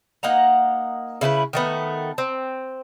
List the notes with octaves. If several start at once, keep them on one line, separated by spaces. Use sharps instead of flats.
A#3 D#4 F#5 A#5
C#3 E4 G#4 B4
D#3 A3 B3
C4